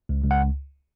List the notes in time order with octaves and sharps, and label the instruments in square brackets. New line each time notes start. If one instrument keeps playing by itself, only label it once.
[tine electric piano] C#2
C#2
F#5